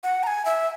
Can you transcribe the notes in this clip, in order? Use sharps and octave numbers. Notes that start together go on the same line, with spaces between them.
F#5
A#5
G#5
E5